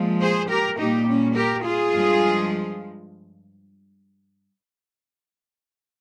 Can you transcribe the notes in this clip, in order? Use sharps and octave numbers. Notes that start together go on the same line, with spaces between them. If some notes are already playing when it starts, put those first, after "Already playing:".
Already playing: A#2 F3 G#3
G#4 C5
G4 A#4
A#2 G3 A#3 D#4 G4
C#4
G4 A#4
F4 G#4
G2 F3 G#3